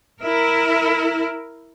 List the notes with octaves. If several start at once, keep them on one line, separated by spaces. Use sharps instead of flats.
E4 A#4